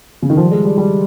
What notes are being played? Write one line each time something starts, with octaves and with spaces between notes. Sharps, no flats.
C#3
D#3
F3
G3
G#3
G3
G3